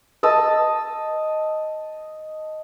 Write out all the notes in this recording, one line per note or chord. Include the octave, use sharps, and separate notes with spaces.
D#5 A5 D#6 E6